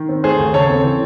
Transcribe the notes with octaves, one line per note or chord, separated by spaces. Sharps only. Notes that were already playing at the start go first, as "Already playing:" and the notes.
Already playing: D#3
C4
A3 G#4 C5
D#2
C#3 A4 C#5
C4
E3